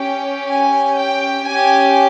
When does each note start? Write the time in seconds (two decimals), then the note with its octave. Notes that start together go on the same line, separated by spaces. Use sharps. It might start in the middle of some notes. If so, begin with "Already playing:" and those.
Already playing: C#4 G4 G5
0.49 G#5
0.98 G5
1.48 C#4 G4 G#5